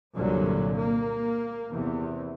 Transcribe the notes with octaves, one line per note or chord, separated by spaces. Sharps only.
C2 G2 A#2 D3 F#3
A#3
E2 C3